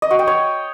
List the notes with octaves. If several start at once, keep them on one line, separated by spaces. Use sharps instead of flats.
D#5
F#4
G5
C#5